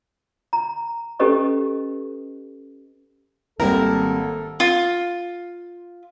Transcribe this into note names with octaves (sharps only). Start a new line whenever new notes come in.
A#5
C#4 G4 A4 B4 D#5 C#6
G#1 G3 A#3 C4 E4 A4 A#4
F4